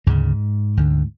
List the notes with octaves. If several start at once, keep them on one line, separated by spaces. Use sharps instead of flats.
D2 G#2 C#3 G#3
D2 D3